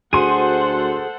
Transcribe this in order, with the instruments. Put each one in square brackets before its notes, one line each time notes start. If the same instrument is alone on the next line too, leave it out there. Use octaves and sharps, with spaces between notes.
[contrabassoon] D2 [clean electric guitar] F#4 G#4 [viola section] A4 C5 F#5 [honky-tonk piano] C6 D#7